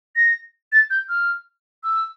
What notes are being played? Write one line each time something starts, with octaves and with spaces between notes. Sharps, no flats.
A#6
A6
G6
F6
E6